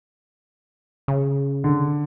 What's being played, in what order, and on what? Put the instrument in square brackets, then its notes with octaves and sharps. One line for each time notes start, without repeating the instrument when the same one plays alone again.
[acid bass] C#3
[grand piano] D3